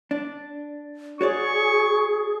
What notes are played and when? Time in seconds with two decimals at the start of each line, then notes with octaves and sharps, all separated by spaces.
0.11 D4
1.21 F#4 G#4 C#5 D5 C#6